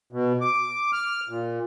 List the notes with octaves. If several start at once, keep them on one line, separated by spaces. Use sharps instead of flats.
B2
D6
F6
A#2